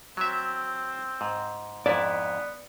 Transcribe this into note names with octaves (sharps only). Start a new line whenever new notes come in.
F#3 C4 E5
G#2
F2 G#2 B3 E4 D5